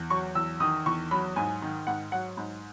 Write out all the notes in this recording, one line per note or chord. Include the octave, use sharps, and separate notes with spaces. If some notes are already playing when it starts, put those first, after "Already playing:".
Already playing: E2
F#3 C#6
E2 E6
D#3 D#6
E2 C#6
F#3 B5
G#2 G#5
D#3
G#2 F#5
F#3 F#5
G#2